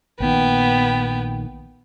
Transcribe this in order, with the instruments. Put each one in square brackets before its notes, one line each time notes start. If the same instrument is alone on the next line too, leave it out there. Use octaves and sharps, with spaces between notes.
[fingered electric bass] A#1 A#2 D#3 [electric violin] B3 G5